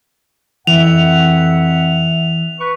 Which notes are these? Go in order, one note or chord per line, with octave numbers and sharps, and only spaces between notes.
F2 E3 E5 F#5 F7
B4 C#6